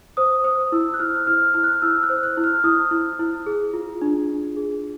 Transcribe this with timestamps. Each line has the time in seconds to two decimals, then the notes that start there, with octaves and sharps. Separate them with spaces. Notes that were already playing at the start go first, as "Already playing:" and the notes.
0.17 C5 D#6
0.44 C5 D#6
0.72 E4 E6
0.94 F#6
0.99 E4 F6
1.27 E4 F6
1.54 E4 F6
1.64 F#6
1.73 F6
1.82 E4 E6
2.03 F#6
2.10 C5
2.23 F#6
2.37 E4
2.44 F6
2.64 E4 D#6
2.91 E4
3.19 E4
3.46 G#4
3.74 F4
4.02 D4
4.29 D4
4.57 G#4